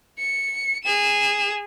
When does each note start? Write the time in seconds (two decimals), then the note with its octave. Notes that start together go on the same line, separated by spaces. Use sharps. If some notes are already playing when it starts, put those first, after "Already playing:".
0.19 C#7
0.84 G#4 E7